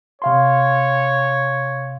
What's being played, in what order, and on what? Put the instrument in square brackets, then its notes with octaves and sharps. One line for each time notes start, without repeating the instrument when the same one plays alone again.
[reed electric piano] C3 F5 C6 [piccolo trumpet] C#5